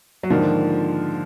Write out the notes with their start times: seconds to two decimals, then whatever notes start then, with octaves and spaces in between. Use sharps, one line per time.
0.23 F#3
0.30 G#2 D3 D#3 F3 A#3 F4